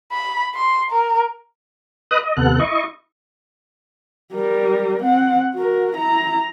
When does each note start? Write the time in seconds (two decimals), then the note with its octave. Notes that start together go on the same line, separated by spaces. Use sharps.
0.12 B5
0.55 C6
0.91 A#4
2.11 B4 D#5 D#6 F#6
2.23 D#5
2.37 D#2 C3 B3 A4 F#6
2.59 E4 D#5 C#6
4.33 G3 A#4
5.03 C4 F#5
5.54 F#4 A#4
5.95 E4 A#5